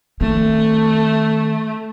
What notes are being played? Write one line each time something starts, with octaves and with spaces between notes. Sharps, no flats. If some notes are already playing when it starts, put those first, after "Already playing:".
D#3 A3 C4